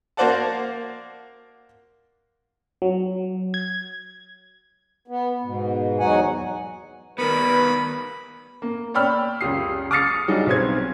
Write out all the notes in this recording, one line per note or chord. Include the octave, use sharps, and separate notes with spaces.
A#3 F#4 C5 D5 F#5 A5
F#3
G#6
B3
G#2 B2
E2 F#3 D#4 F#4 F#5 G#5
D#3 G3 B3 A#4 B4 B5
A#3
C#5 D5 G5 B5 E6 F6
C#2 F#2 G4 D#6 C7
D6 D#6 F6 A6 C7 C#7
F#3 G3 D4 D#4 G#4
B1 C4 C5 G#6